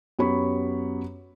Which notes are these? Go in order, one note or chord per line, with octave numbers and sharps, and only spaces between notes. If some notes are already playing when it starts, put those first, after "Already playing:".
F#2 B3 G4 C#5 B5 C#6